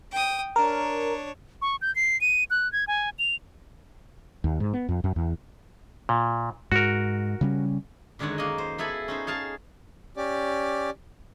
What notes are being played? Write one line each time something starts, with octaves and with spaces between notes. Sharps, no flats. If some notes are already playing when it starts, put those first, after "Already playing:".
G5 D#6
D4 A#4 C#5
C#6
G6
C7
D#7
F#6
G#6
G#5
F7
D#2
G#2
B3
F2
F#2
E2
A#2
G#2 F#4 A#4
C#3 G3 C#4
F#2 D3 D#3 G#3 C#5 F#5
A#3 D#5
C5
B3 E4 G#4 A4 B4
C#4 D#4 C5
G#4 C#5 F5 A5
C#4 G4 D5